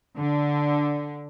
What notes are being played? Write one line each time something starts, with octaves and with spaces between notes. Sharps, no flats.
D3